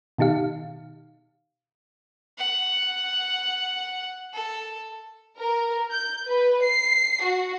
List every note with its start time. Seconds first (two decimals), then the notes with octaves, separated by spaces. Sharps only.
0.18 B2 D#3 D#4 G4 F5
2.38 F#5
4.34 A4
5.39 A#4
5.92 G6
6.27 B4
6.64 C7
7.24 F#4